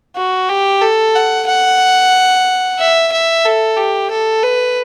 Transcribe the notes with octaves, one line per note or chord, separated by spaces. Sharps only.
F#4
G4
A4
F#5
F#5
E5
E5
A4
G4
A4
B4